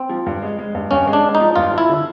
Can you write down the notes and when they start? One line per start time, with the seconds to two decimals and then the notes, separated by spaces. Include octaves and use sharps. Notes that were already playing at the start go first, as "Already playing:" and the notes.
Already playing: C4
0.09 F3
0.26 G2
0.42 G#3
0.59 G#3
0.75 G2
0.91 G2 C#4
1.07 G#3
1.13 D4
1.24 G#3
1.35 D#4
1.40 F3
1.56 G2 F4
1.73 F3 E4
1.89 D3